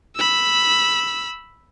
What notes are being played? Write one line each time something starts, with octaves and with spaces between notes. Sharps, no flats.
B5 E6